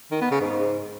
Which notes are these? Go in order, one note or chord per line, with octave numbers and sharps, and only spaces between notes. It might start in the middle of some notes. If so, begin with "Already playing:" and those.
D#3
B3
C#3
G#2